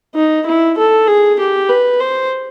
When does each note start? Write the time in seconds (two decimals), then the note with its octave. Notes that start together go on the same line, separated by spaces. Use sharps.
0.15 D#4
0.46 E4
0.78 A4
1.07 G#4
1.39 G4
1.69 B4
2.00 C5